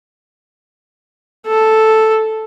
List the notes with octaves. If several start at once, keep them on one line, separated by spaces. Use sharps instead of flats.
A4